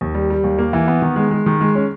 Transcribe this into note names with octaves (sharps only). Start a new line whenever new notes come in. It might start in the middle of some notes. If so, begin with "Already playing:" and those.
D#2
G3
G3
D#2
A#3
E3
B3
D#3
G#3
G#3
D#3
G#3
C#4